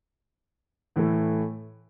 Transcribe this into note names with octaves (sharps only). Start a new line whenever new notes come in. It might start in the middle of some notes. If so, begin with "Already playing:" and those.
A2 E3 A3